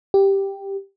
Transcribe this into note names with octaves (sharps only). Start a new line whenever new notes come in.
G4